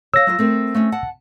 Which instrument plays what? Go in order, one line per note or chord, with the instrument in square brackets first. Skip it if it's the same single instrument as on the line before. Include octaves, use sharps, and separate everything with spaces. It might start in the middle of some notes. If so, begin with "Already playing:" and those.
[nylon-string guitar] C#5 F5 [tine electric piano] E6 A#6
[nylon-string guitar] F#3 F4 F5
A3 C4 A#4
A3 C4 C#4
F#5 A5